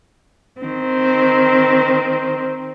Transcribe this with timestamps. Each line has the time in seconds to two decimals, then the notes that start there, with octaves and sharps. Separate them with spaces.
0.61 D#3 C4